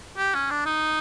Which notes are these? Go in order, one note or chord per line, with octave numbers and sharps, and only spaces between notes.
G4
C#4
D4
D#4